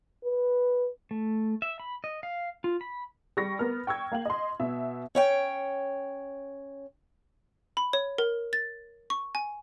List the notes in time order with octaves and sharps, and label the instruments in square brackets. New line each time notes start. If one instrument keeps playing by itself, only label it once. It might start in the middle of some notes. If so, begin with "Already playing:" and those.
[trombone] B4
[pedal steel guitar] A3
E5
B5
D#5
F5
F4
B5
[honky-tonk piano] G3 C#6 A#6
B3 A#4 F6
G5 C#6 E6 G#6
A#3 F5 G5 F#7
D#5 C6
B2 E5
[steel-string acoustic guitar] C#4 C#5 G5
[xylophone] B5
C#5
A#4
A6
C#6
G#5